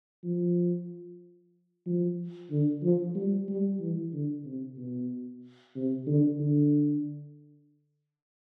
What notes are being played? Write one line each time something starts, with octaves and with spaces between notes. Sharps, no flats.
F3
F3
D3
F3
G3
G3
E3
D3
C3
B2
C3
D3
D3